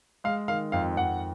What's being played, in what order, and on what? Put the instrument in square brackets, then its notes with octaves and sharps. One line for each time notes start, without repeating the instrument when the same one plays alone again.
[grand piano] G#3 [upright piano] F5
[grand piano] D#3 [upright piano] F5
[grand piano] F2 [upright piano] F5
[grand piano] F2 [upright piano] F#5